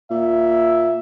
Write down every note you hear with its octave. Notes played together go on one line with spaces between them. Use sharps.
A#2 E5